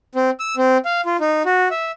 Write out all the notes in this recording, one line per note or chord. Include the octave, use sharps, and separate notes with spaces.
C4
E6
C4
F5
F4
D#4
F#4
E5